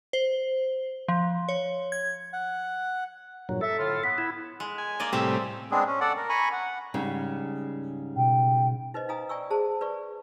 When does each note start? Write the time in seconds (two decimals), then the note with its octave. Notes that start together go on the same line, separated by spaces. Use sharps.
0.13 C5
1.08 F3
1.49 C#5
1.92 G#6
2.33 F#5
3.49 G2 A#2 F#3
3.61 A4 E5
3.78 A2 D3 F4
4.03 B3 B6
4.18 E4
4.60 G#3
4.78 G#5
5.00 A#3 D5 D#5
5.13 A2 C3 G3 C4 G#4 E5
5.71 G#3 B3 C4 D4 G#4
5.87 C#4
6.01 A4 D5 F#5
6.17 A#4
6.29 G#5 A#5 B5 C#6
6.52 F#5
6.94 G#2 C#3 G3
8.16 B2 G5
8.94 D#4 B4 C5 D#5
9.09 D#4 F5 G#5 A#5 D#6
9.29 D5 G5 G#5 C#6 E6
9.50 G#4 C5 A5
9.81 B4 D5 C#6